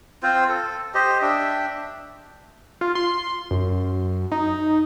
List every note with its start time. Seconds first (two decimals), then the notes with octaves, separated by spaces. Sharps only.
0.23 C4 F4 C5
0.49 A4
0.94 G4 C5 D#5
1.22 D4 E5 G5
2.81 F4
2.95 C6
3.51 F#2
4.32 D#4